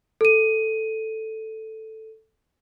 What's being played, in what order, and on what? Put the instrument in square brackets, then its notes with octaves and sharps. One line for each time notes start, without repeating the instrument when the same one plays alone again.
[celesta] A4 D#7